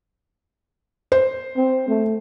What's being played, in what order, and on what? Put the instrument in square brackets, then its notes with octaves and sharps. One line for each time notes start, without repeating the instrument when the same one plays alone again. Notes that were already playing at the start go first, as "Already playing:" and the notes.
[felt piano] C5
[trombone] C4
A3